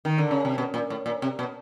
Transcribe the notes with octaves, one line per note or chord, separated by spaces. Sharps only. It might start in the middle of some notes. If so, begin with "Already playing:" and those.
D#3
D3
C#3
C3
B2
A#2
A2
A#2
C3
B2